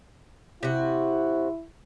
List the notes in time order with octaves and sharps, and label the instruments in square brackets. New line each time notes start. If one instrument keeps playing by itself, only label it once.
[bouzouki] C3 F#4 [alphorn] E4